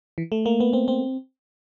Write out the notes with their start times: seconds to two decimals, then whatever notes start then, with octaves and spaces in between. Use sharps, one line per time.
0.18 E3
0.32 A3
0.46 A#3
0.60 B3
0.73 C4
0.88 C4